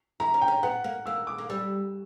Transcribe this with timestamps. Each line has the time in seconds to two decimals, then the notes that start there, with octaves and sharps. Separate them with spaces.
0.20 E4 A#5
0.34 C#4
0.41 G5
0.48 C#4
0.63 B3 F#5
0.84 A#3
1.06 A#3 E6
1.27 D6
1.38 A#3
1.50 G3 E6